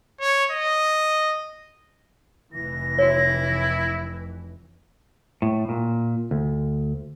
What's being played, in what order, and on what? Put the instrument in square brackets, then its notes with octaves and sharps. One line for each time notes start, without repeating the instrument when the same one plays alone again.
[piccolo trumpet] C#5
D#5
[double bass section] F1 E3 [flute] A#6
[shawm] E4 [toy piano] F#4 C#5
[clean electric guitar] A2
A#2
D2